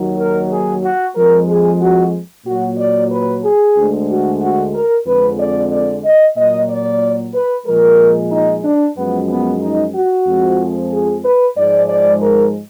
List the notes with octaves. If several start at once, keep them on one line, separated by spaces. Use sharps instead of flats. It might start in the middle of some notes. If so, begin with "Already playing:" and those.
Already playing: D#2 D#3 F#3
A#4
G#4
F#4
F2 F3 G#3 A#4
G#4
F#4
A#2 F#3 F#4
D5
B4
G#4
D2 D3 G#3
F#4
F#4
A#4
F2 D3 G#3 B4
D5
D5
D#5
A#2 F#3 D#5
D5
B4
A#2 F3 G#3 A#4
D#4
D4
F#2 F3 G#3 B3
B3
D#4
F#4
F2 F3 G#3
G#4
B4
G#2 F3 G#3 D5
D5
A#4